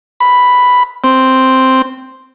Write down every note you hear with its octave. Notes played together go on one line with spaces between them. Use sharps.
B5
C4